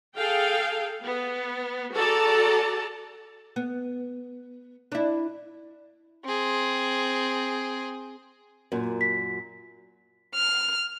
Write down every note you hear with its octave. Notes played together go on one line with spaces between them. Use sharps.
G#4 A4 F5 G5
B3
F#4 G#4 A4 D5 A5 A#5
B3
D4 E4
C4 G#4
F#2 A#2
B6
F6